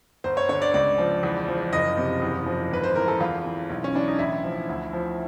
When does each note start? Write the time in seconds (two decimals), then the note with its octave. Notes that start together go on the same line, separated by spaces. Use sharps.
0.24 G1 C5
0.37 C#5
0.49 D3 C#5
0.62 D5
0.74 C#2 D5
0.98 F3
1.23 E2
1.48 F3
1.73 F#1 D#5
1.97 C3
2.22 E2
2.46 F3
2.71 G#1 B4
2.84 C5
2.96 E3 A#4
3.08 A4
3.20 E2 F4
3.45 E3
3.70 B1
3.84 C#4
3.94 E3 D4
4.08 D#4
4.19 A1 E4
4.44 F3
4.69 D2
4.93 F3